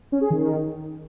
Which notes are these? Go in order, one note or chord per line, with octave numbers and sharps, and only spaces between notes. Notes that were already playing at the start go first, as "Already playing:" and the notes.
C#4
G#4
D#3